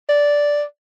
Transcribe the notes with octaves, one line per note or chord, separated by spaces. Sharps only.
D5